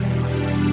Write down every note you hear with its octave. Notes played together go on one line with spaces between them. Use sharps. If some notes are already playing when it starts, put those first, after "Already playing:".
Already playing: E2 B2 G3
D4